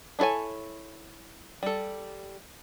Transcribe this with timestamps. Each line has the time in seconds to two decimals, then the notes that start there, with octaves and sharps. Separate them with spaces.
0.19 D4 E4 A4 C#5 G#5
1.63 G3 A4